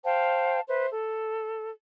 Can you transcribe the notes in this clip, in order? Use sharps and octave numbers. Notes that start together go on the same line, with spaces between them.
C5 F5 G5 A5
B4 C5 E5
A4